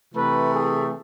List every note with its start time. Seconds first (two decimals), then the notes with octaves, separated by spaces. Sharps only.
0.13 C3 E3 A3 B4
0.53 G#4